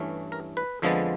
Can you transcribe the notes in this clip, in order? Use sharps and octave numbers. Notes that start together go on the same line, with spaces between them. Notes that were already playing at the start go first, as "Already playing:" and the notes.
Already playing: G2 E3 A3 C#4
A#4
B4
F2 D3 F3 G#3 B3